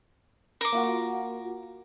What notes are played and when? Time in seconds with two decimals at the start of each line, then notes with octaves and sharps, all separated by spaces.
0.61 A#4 D6
0.73 A#3 F4 F#4